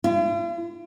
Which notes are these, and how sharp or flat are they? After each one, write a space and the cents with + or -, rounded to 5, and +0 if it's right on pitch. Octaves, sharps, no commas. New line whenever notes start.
F4 -45